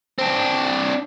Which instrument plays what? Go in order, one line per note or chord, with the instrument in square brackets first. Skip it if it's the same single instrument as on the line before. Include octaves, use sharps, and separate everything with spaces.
[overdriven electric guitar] C4 D4